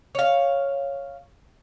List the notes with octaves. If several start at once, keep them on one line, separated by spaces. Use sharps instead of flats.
C#5 F5